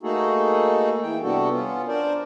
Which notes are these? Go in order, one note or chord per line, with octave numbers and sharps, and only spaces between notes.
A3 A#3 D#4 F#4 G#4 A4
E3 G5
C3 G3 B3 D4 F#4 A4
B3 C#4 F4
D4 A#4 C5 D5